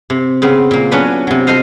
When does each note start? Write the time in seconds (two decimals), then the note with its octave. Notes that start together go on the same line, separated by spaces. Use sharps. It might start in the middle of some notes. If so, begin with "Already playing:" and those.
0.10 C3
0.42 C#3 B3 C4
0.71 A#2 A#3
0.91 F#3 B3 C#4 D4 B4
1.27 C3 F#3
1.47 F4 A4 C5 D#5 F5